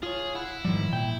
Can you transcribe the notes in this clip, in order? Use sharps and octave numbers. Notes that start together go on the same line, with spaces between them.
F4 G#4 C#5
E4 F#5
G#2 D#3 F3 G3
A#2 G5